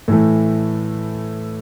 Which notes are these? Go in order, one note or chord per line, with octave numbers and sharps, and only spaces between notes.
A2 E3 A3